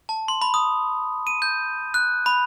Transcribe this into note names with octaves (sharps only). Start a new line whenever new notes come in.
A5
C6
B5
D#6
D#7
G6
F#6
B5